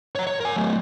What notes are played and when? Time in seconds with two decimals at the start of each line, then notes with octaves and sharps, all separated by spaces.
0.15 C#5 A#5
0.27 C#5
0.41 A#4 G#5
0.56 F#3 A3